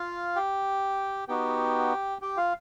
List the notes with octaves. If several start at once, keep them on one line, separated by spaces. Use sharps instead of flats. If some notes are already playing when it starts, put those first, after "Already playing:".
Already playing: F4 F5
G4 G5
B3 D#4 F#4 G4 G5
G4 G5
F4 F5